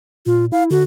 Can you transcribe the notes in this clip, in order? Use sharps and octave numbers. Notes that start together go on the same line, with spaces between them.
A#2 F4
E4 F5
D3 F#4